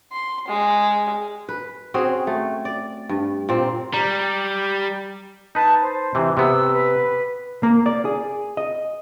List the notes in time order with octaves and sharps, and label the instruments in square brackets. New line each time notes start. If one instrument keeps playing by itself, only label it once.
[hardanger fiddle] C6
G#3
[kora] B4
C4 C#4 F#4 G#4
A3
D5
G2
A#2 C4
[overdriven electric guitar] G3 [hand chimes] A#5
[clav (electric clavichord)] D#4 B4 [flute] A5
[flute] C5
[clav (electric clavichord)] C3 E3
[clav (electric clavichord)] C3 B3 [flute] E6
[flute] B4
[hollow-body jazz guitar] A#3
D5
G#4
D#5